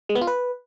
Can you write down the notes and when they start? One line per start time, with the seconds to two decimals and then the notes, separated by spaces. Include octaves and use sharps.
0.09 G#3
0.15 B3
0.21 F4
0.27 B4